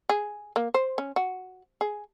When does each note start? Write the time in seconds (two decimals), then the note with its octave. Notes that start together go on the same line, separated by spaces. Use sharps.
0.09 G#4
0.56 A#3
0.74 C5
0.98 C#4
1.16 F#4
1.81 G#4